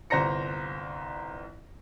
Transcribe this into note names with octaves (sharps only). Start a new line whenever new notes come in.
G1 C2 C5 A#5 A#6 C#7